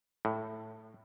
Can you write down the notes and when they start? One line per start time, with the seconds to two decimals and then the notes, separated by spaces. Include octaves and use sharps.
0.25 A2